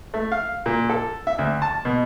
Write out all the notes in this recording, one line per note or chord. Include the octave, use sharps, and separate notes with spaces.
A3
F5
A#2
A4
E5
D2
A5
B2